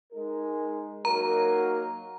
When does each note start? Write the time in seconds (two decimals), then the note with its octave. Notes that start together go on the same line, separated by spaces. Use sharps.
0.12 G#3 D#4 A#4
1.05 F#3 A#3 D#4 F#4 A#4 A#5